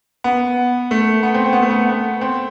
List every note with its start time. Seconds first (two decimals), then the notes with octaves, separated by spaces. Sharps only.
0.24 B3
0.91 A3
1.23 B3
1.34 C4
1.46 C4
1.53 B3
1.62 A3
1.70 B3
1.89 B3
2.21 C4